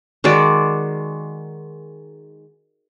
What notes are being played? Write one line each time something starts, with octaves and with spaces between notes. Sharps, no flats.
D#3 G#3 F#4 D5